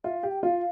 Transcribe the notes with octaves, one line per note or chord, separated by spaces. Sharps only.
F4 E5
F5
G4
G5
F4 F5